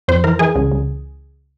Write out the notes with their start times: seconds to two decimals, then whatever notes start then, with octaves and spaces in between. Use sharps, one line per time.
0.08 F2 C5
0.24 E3 A#4
0.39 E3 G#4
0.55 C#2
0.72 C#2